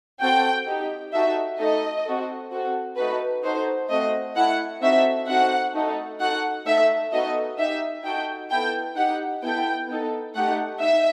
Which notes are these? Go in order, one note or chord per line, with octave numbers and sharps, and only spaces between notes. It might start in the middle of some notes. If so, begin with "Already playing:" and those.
C4 F#4 A4 G5
D#4 G4
D#4 F#4 A4 E5
A3 D#4 A4 D#5
C4 F#4 A4
C4 F#4 A4
A3 D#4 F#4 A4 B4
D#4 F#4 A4 C5
A3 C4 F#4 D#5
A3 E4 A4 F#5
C4 D#4 F#4 A4 E5
C4 D#4 F#4 A4 F#5
A3 D#4 A4
D#4 F#4 A4 F#5
A3 D#4 A4 E5
B3 D#4 F#4 A4 D#5
D#4 G4 E5
D#4 F#4 A4 G5
B3 E4 A4 G5
D#4 G4 F#5
B3 E4 A4 G5
B3 D#4 A4
A3 D#4 G4 F#5
D#4 E5